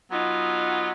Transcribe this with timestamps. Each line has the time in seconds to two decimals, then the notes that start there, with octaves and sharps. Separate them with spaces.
0.12 F#3 B3 D#4 F4